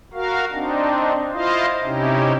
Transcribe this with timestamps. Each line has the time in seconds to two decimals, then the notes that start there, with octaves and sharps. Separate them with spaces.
0.13 F#4 A#4 F5
0.52 C4 D4 D#4
1.33 E4 F4 C5 D#5 F5
1.84 C3 C#4 D#4 E4 G4